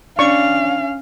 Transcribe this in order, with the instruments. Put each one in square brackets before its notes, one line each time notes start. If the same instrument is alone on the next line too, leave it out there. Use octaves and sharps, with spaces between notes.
[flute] C#4 [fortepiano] D4 [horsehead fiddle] F5 [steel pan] C#6